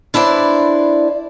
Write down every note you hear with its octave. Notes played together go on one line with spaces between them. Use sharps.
D4 E4 B4 C5 D5